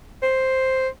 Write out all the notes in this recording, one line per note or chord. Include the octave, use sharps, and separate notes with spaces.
C5